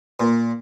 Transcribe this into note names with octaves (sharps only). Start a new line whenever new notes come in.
A#2